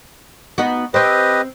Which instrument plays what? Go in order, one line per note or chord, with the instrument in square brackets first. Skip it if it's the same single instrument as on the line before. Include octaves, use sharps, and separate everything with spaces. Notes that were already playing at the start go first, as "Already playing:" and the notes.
[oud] B3 D#4 F#4
[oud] C4 C5 [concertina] G4 B4 D#5